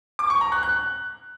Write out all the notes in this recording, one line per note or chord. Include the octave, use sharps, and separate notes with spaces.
D6
C#6
A#5
F#6
F#6